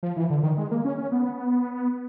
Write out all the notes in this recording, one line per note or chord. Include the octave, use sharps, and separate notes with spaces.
F3
E3
D3
D#3
G#3
A#3
C#4
C#4
B3